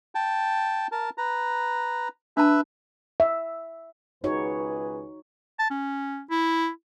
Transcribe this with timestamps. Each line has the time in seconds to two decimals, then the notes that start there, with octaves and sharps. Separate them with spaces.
0.15 G5 A5
0.92 A#4 A5
1.18 B4 A#5
2.37 D4 B4 E5 A5
3.20 E5
4.24 C#2 D#4 F#4 G#4 B4 C#5
5.59 A5
5.70 C#4
6.30 E4